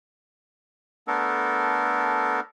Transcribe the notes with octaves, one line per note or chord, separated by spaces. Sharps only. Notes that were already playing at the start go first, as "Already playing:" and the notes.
A3 B3 D4 A4 A#4